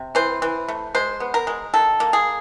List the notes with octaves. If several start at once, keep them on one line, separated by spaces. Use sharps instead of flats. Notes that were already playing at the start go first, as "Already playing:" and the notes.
Already playing: C3
E3 C5
E3
A3
G#3 C5
B3
A#4
G#3
D#3 A4
A#3
G#4